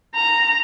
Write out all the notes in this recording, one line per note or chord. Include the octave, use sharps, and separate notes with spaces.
A#5